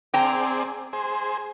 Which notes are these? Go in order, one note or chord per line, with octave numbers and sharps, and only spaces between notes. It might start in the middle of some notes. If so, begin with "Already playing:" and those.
C4 G#4 D5 G5 A#5
G#4 C5